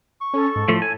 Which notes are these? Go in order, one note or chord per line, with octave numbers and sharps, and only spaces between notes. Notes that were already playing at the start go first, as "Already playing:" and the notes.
C#6
C#4 A4
G#2
A2 F3 A3
G#5